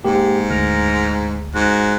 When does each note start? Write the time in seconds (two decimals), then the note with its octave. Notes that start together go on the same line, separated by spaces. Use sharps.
0.04 G#2 A#3 G4
0.50 D2 A#4
1.55 G#2 F#4